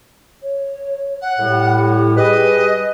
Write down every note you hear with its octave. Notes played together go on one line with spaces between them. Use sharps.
C#5
F#5
A2 G3
G#4 B4 D#5